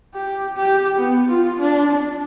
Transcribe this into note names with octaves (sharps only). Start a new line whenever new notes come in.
G4
G4
B3
F4
D4
D4